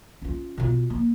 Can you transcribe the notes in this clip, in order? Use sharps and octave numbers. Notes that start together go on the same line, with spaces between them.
C#4 F4
B2 F4
A#3